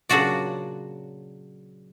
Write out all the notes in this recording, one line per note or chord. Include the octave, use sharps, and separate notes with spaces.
A#2 C#3 F#3 D4 F#4 D5